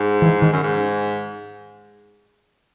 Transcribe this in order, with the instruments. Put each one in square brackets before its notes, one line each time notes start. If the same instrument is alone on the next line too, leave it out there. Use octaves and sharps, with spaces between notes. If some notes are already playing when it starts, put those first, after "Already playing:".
Already playing: [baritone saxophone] G#2
[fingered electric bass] E3
D#3
[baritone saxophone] F#2
G#2